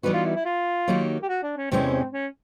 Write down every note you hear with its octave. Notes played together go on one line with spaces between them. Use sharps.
E3 G3 B3 D#4 F#4 B4
F4
E4
E4
F4
D#3 F#3 A#3 D#4 G4
G4
F#4
D4
C#4
E2 C3 E3 G#3 C4 C#4
C4
C#4